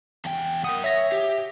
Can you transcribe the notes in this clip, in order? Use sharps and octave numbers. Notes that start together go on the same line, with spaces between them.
E2 G5
A#4 F#5 G5 D#6
C#5 E5 A#6
G4